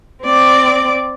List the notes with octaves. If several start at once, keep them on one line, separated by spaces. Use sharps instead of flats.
C4 D5